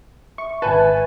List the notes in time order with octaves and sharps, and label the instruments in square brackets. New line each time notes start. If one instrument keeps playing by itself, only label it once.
[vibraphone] E5 [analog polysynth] C#6
[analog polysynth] G#1 G#5 A5 [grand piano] B4